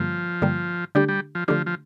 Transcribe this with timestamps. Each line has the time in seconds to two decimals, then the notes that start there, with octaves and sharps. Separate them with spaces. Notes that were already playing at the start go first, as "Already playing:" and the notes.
Already playing: G2 D3 F3 G3 A#3
0.42 G2 D3 G3 A#3
0.95 D3 G3 A3 D4 G4
1.08 G3
1.35 F3
1.48 D3 F3 A3 D4 G4
1.66 F3